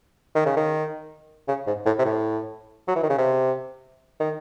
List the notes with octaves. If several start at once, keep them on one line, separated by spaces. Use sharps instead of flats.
D#3
C#3
D#3
C#3
G#2
A2
C3
A2
F#3
E3
D#3
C#3
C3
D#3